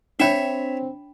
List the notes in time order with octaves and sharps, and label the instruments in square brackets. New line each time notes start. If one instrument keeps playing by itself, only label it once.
[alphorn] C4 [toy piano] D4 G5 B5 [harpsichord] C#5 E5